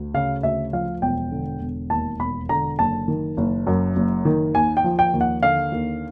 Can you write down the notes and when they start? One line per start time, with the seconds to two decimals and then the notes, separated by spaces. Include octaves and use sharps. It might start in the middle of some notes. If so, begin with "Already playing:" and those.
Already playing: D2
0.14 C#3 F5
0.43 D2 E5
0.73 F3 F5
1.02 E1 G5
1.32 D3
1.61 E1
1.90 D#2 A5
2.20 E1 B5
2.49 D3 A#5
2.79 F#1 A5
3.08 D#3
3.37 F#1
3.67 F#2
3.96 F#1
4.25 D#3
4.55 D#2 G#5
4.77 G5
4.84 F3
4.99 G5
5.14 D#2
5.21 F#5
5.43 D3 F5
5.72 D#2